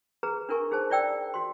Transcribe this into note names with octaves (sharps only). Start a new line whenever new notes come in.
G#4 B4 A#5
D4 E4 A#4 G#5 C#6
D#4 G#4 C5 A5
E4 D5 G5 E6
F#4 C6